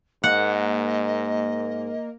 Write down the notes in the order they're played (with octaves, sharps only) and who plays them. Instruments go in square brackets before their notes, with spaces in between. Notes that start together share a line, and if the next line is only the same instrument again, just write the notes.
[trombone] G#2 [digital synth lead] A#3 [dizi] D#5 [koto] F#5